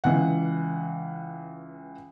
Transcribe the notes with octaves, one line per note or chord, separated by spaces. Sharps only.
C#2 E3 F#5